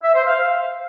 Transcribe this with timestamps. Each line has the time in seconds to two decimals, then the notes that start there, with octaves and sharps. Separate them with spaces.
0.03 E5
0.14 C5
0.26 F5